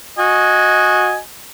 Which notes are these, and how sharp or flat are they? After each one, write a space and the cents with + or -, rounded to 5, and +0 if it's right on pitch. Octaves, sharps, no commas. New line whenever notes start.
F#4 -15 D#5 +0 G#5 +0